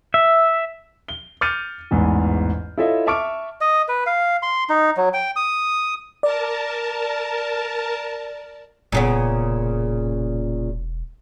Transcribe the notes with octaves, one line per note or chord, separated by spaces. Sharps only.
E5
G7
D6 F6 G6 A6 C#7 D#7
A1 E2 G#2 E3
E4 F4 A4 C#5 D#5 E5
E5 A5 C#6 D6 F6 D7
D#5
B4
F5
C6
D#4
F#3
G5
D#6
A#4 D5 A5
E1 A#2 C#3 B3